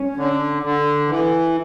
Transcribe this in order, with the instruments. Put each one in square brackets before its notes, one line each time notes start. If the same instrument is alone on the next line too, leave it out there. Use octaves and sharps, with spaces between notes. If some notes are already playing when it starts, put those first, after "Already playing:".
Already playing: [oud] C#4
[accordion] D3
D3
E3